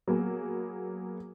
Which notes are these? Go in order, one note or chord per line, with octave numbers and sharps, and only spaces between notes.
F#3 A#3 B3 G#4